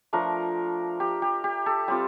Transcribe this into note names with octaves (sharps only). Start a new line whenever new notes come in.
F3 A3 D4 A#4
G4
G4
G4
A4
G3 C4 F4 G4